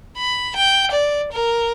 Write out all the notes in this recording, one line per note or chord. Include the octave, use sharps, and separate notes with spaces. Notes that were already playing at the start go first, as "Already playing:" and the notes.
B5
G5
D5
A#4